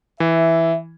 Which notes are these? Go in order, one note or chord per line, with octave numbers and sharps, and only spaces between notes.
E3 E5